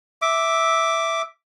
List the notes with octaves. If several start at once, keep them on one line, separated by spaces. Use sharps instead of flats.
E5 D6